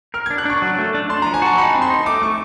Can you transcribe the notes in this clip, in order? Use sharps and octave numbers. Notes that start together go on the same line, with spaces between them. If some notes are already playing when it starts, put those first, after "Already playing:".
A#4 F6
G#6
D4
F#6
D4 C#6
F#3
A3
D4
D4 C6
A#5
F3
G#5
F#4 A5
D#4 B5
C4
C6
D#4
A3 D6
A3 C#6